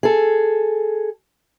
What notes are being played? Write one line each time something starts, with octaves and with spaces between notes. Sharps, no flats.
G#4 A4